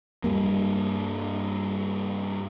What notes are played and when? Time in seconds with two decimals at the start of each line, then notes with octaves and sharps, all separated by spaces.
0.24 G2 G3 A#3